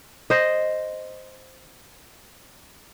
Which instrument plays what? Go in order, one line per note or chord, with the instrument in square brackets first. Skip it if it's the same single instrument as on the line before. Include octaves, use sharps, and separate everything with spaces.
[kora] C5 D#5